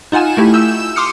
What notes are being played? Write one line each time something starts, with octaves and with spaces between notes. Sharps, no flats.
D#4 F4 F#5 G#5 E7
A3 E4 G4
E6 G6 E7
C6 D6 D#6 F6 C#7